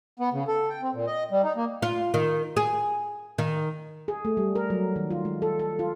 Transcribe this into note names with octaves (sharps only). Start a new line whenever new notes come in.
B3
C#3
A4
G5
C4
A#2
D#5
G3
D#4
A#3
F4
D#3
G#4
D#3
G#4
A3
G3
A#4
F#3
D#3
F4
G#3
A4
A4
F4